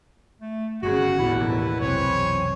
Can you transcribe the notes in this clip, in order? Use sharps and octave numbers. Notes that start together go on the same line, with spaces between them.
A3
G1 C#3 F#4 G#4 F#5
A1 D#2 B2 D3 E4
B4
F1 B1 C3 E3 C4 C#5 G#5